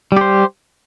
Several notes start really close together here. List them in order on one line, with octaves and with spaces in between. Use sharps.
G3 G4 C5